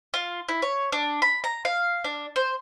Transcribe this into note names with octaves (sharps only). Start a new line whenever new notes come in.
F4
E4
C#5
D4
B5
A#5
F5
D4
C5